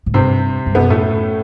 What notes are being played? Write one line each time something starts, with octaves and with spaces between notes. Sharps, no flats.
A2
G2 C3 C4
G2
F#2 B2 B3
A2 A3